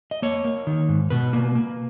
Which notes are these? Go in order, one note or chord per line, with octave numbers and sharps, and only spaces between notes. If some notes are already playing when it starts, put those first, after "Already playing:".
D#5
A#3 C#5
A#3
D#3
G#2
B2 B4
A#3
A#3